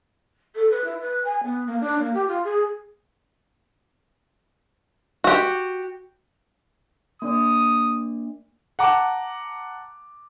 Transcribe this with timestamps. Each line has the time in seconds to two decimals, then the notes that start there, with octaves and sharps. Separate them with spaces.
0.55 A4
0.70 B4
0.84 E4
1.00 B4
1.24 G#5
1.43 B3
1.66 A#3
1.80 D4
1.98 A#3
2.13 G4
2.27 F4
2.43 G#4
5.24 F#4 G4
7.22 A#3 D4 D5 D#6
8.79 F#5 A5 A#5 D6